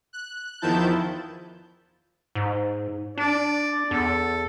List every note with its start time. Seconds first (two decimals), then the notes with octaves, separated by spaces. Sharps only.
0.13 F#6
0.61 E2 D#3 F3 E4 A5 G6
2.35 G#2
3.18 D4 D5
3.91 E2 A4